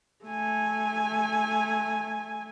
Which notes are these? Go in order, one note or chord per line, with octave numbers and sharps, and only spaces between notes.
A3 G#5